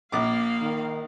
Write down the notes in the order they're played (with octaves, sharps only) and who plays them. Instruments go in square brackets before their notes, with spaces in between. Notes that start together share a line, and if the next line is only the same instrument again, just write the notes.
[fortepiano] A#1 D6 [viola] A#3 F5
[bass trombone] D#3